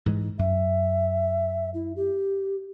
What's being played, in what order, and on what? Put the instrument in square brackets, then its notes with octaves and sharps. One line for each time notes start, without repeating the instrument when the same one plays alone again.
[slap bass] G#2 E3 G#3
[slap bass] F#2 [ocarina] E5
[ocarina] E4
G4